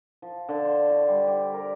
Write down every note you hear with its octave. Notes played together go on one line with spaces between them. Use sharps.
F3
D3
C5
F#4
G3
G4
A#4